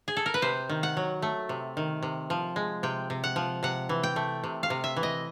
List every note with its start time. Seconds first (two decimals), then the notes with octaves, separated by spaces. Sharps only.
0.08 G#4
0.17 A4
0.26 A#4
0.34 B4
0.42 C3 C5
0.69 D#3
0.83 F#5
0.97 F#3
1.22 A3
1.49 C3
1.77 D#3
2.03 C3
2.30 F3
2.56 G#3
2.83 C3 G5
3.10 C3
3.24 F#5
3.36 F3
3.63 C3 F#5
3.89 E3
4.03 G5
4.16 A3
4.44 C3
4.63 F5
4.70 C3
4.84 E5
4.96 E3
5.03 D#5